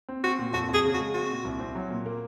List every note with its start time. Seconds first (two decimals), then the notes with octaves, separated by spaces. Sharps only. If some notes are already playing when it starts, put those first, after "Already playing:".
0.09 C4
0.24 C4 F#4
0.39 A#2
0.53 F2 F#4
0.69 F2
0.74 G#4
0.85 C#3
0.94 F#4
0.99 G#3
1.14 C4 F#4
1.29 A#2
1.45 C2
1.60 C4
1.75 F#3
1.90 A#2
2.06 A#3